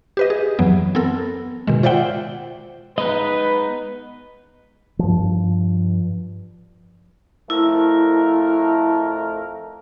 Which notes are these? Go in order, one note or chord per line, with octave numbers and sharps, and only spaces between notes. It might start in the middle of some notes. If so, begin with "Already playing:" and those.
G4 B4 D#5
G#4
F#2 E3 F#3 B3
B3 C4 A4 A#4
B2 D#3 G#3
F4 C5 D5 E5 F#5 G5
G#3 B3 D#4 B4 D#5
G2 F3
F2 A3 E4 A#4